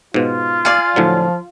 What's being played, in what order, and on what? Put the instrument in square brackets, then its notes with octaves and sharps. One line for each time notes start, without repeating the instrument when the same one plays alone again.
[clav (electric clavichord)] G#2 B2 [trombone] F4
[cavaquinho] D5 F5 G#5
[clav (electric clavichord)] A2 D3 F#3 [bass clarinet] F3